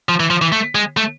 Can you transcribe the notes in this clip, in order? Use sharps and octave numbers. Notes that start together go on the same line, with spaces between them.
F3
E3
F3
E3
A3
G#3
A3